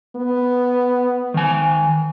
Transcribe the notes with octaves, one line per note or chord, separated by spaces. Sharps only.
B3
D#3 G#5